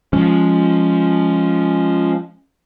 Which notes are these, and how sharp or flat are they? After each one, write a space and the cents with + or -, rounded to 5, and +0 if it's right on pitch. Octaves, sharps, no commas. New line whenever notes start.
F3 +0 G#3 +0 C#4 +0